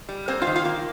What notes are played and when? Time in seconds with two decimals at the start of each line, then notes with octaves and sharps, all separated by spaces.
0.09 G3
0.28 A#3 C4 C5
0.42 F4 F5
0.47 D#3
0.56 F4 F5
0.65 A#3